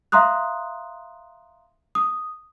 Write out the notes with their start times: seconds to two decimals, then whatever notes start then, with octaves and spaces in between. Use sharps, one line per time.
0.12 E5 F5 A#5 C6 D#6 F#6
1.95 D#6